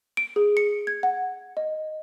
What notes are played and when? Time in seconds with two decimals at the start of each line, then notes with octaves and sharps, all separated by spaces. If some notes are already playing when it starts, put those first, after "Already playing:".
0.17 D7
0.36 G#4
0.57 C#7
0.87 G#6
1.03 F#5
1.57 D#5